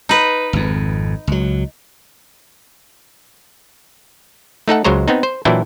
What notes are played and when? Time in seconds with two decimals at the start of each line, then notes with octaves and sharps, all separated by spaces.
0.09 D#4 B4
0.53 G#1 F2
1.27 C#2 F#3
4.68 A3 D#4 A4 F#5
4.84 C#2 F#3 G#3 C5 C#5 A#5
5.08 B3 C4 D#4
5.23 C5
5.45 A#2 E3 F#3 D4 E4 G5